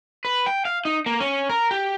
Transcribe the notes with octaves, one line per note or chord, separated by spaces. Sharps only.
B4
G5
F5
D#4
A#3
C#4
A#4
G4